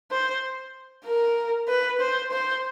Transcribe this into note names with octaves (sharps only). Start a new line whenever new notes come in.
C5
A#4
B4
C5
C5